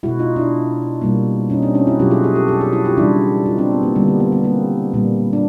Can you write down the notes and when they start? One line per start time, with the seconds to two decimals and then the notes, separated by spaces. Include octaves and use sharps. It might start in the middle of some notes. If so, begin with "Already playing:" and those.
0.03 B2 G#3 E4 F#4
0.19 D#4 F4
0.36 D4 E4
1.01 B2 G3 A#3
1.50 C#4 D#4
1.62 C4 D4
1.74 C#4 D#4
1.87 E4 F#4
1.99 B2 F#3 A3 F4 G4
2.11 F#4 G#4
2.23 F#4 G#4
2.36 G4 A4
2.48 G4 A4
2.61 F#4 G#4
2.73 E4 F#4
2.85 F4 G4
2.97 C#3 E3 G3 D4 E4
3.46 D#4 F4
3.58 C4 D4
3.71 B3
3.83 A#3
3.96 D3 G3 A#3 B3
4.08 A#3
4.20 B3
4.32 B3
4.44 A#3 C4
4.94 A#2 G3 A#3
5.33 D4